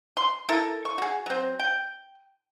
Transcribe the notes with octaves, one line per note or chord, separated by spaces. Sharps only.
C6
E4 A4 A#4
C#6
F#4 G#4
F#3 C4
G5